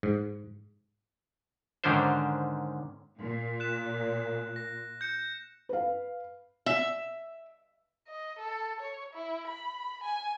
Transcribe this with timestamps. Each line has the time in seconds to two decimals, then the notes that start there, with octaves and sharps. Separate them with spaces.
0.03 G#2
1.84 G#2 D3 D#3 C#4 D4 C5
3.18 A#2
3.60 F#6 E7
4.56 A#6
5.01 G6 C#7
5.69 B4 F5
6.66 E5
8.08 D#5
8.39 A4
8.80 C#5
9.13 E4
9.47 B5
10.03 G#5